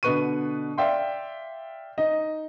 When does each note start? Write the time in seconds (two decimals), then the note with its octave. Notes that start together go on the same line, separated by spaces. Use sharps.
0.03 B2 D3 B4 C#6 D#7
0.78 D5 E5 F5 G5 C6
1.98 D#4 D#5